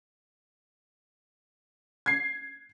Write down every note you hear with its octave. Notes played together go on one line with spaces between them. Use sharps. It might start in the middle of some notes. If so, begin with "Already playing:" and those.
G#6 C7